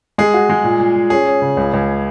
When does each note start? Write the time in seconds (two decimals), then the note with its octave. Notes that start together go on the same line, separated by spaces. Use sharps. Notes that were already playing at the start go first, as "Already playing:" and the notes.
0.18 G#3 G#4
0.34 F#4
0.50 G#3
0.64 A#2
0.80 A#2
0.96 A#2
1.10 C#4 G#4
1.26 C#4
1.42 C#3
1.57 C#2
1.73 C#2